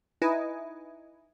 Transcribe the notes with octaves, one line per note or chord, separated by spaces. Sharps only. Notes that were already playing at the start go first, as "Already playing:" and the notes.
D#4 E4 B4 D#5 G#5